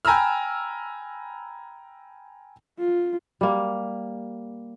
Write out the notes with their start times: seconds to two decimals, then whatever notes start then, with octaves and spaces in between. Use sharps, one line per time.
0.05 G5 G#5 A#5 B5 E6 F6
2.79 F4
3.41 G3 A#3